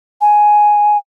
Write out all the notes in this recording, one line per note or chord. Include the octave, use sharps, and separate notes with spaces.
G#5